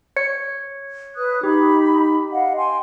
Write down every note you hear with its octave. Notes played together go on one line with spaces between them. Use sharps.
C#5 C#7
B4 D#6 F#6
D#4 G4 B5
D#5 F5 F#5
G5 G#5 C6